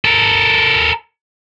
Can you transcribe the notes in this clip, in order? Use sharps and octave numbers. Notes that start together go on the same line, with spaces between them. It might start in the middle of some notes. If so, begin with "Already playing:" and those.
A4 A#4